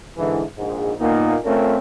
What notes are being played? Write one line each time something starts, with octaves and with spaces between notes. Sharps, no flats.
G#2 D3 E3
A#1 G#2
A#2 A#3 B3 D#4
A3 C4 C#4 F4 A#4